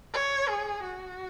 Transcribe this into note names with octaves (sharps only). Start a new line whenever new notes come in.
C#5
G#4
F#4